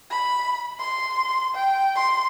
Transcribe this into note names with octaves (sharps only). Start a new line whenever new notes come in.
B5
C6
G5
C6